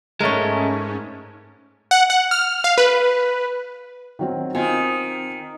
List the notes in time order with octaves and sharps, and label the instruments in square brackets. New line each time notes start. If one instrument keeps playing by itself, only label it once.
[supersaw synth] G#2 C#4 [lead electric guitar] G#3 A3 [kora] A#4 C#5
[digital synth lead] F#5
F#5
F6
F5
B4
[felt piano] D#3 F#3 C4
[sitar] D#3 [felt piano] C4 F4 G#5